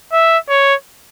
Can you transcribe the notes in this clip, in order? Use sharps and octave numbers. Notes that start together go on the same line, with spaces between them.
E5
C#5